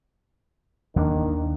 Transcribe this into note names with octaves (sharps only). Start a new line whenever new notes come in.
D#2 D#3 A#3 D4